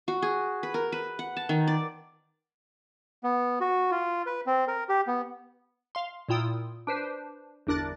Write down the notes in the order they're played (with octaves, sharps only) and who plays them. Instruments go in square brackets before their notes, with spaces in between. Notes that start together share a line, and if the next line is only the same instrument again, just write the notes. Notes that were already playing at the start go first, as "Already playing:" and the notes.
[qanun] F#4
G#4
B4
A#4
B4
F#5
A5
D#3
D5
[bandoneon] B3
F#4
F4
B4
C4
A#4
G4
B3
[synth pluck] F5 C6
A#2 E4 F4 G5 D#6 E6
D4 B4 C5
G1 E2 D4 A#4 F#6 A6